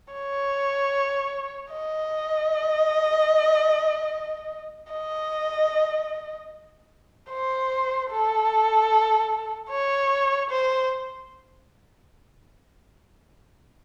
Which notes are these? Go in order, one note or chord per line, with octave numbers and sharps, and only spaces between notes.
C#5
D#5
D#5
C5
A4
C#5
C5